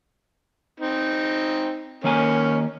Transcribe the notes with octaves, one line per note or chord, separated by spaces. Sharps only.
C4 D#4
D#3 A#3 C#4 A#4 G#5